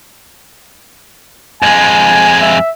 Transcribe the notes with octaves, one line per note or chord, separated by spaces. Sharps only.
F2 G#3 G#5
E5